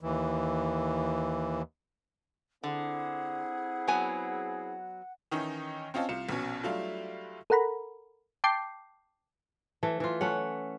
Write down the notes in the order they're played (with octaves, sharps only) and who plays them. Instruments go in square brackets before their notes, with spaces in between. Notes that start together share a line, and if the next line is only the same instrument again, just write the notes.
[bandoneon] D#2 E3
[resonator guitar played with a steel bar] D3 [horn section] C4 E4 G#4 [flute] F#5
[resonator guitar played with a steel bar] F#3 B3 G#5
[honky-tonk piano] D#3 E3 C#4 D#4
C4 C#4 F4 D#5 F5 A5
C2 F4 C#7 E7
A#1 B2 C#4
F#3 G3 A3 D4 E4 F4
[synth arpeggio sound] A4 A#4 F#5 A#5 B5
G5 A5 D6 G6 C7
[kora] E3 A3
E3 F4
A3 C#4 F#5